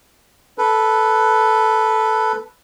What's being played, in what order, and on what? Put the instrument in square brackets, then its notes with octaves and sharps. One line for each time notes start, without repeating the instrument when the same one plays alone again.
[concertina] A4 B4